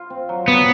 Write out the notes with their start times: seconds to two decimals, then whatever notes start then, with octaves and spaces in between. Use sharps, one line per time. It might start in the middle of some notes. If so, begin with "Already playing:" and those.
Already playing: F4
0.10 C4
0.29 F#3
0.48 F#3 B3